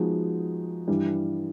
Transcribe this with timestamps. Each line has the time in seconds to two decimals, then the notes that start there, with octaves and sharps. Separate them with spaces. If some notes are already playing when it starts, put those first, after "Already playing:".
Already playing: F3 G#3 B3 D#4 F#4
0.88 G2 E3 G3